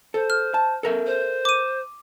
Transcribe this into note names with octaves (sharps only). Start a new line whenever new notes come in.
A4 C5
F6
A5
A4 A#4 E5
C5
D6 D#7